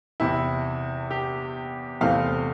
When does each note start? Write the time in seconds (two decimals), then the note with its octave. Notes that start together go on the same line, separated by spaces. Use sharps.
0.20 E2 C3 E3 E4
1.11 G4
2.01 E2 C3 E3 A3 C4 F5